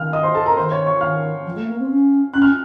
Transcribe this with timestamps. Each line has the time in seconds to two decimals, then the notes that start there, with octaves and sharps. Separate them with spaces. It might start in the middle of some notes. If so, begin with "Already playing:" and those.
Already playing: D#3 F5 F6
0.13 D#5 D#6
0.23 C5 C6
0.35 A4 A5
0.46 A#4 A#5
0.57 D#3 C5 C6
0.71 C#5 C#6
0.86 C#5 C#6
1.01 D#3 F5 F6
1.45 F3
1.56 A3
1.67 A#3
1.79 C4
1.89 C#4
2.33 C#4 F#6
2.42 F6